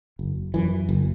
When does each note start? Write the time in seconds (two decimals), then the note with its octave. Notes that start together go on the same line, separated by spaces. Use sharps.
0.19 F#1
0.54 F#2 E3
0.89 F#1